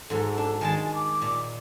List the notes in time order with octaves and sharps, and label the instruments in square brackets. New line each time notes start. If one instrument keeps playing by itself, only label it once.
[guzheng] G#2 F#3 [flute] A4
[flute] A4
[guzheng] D4
[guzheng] D#3 G#3 A5 [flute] G#5
[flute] D6
[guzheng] A#2